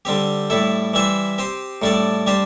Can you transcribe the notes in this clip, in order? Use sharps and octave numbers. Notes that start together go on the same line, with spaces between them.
D3 G3 C4 G4
A2 G3 E4 A4
E3 G3 E4 C5 E5
C4 G4 C5
A2 G3 D4 A4 D5
G3 D4 G4 C5